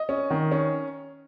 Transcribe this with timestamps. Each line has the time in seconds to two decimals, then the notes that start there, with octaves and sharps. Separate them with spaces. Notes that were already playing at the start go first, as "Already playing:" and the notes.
Already playing: D#5
0.09 C#4
0.30 D#3
0.52 C#4